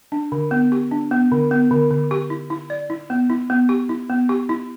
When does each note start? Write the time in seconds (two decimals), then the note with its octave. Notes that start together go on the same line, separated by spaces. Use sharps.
0.12 D4
0.32 D3
0.51 B3
0.72 G4
0.91 D4
1.11 B3
1.32 D3
1.51 B3
1.71 D3
1.90 D3
2.11 G4
2.30 E4
2.50 E4
2.70 D5
2.90 E4
3.10 B3
3.30 E4
3.50 B3
3.69 G4
3.89 E4
4.10 B3
4.29 G4
4.49 E4